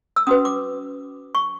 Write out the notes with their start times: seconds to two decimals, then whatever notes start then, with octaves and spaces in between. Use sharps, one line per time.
0.16 E6
0.27 C#4 F#4 B4 D#6
0.45 D6
1.35 C#6